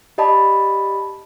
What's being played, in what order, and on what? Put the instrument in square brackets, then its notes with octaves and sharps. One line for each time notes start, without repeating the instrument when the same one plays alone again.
[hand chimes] G4 D5 D#5 A5 B5